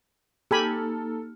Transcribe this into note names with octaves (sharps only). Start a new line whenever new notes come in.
A#3 D#4 G4 A4 G#5 B5 F6